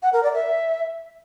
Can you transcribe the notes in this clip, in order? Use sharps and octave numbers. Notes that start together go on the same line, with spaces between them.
F#5
A#4
D5
E5